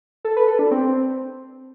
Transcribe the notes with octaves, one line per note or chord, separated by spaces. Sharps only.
A4
B4
A4
D4
C4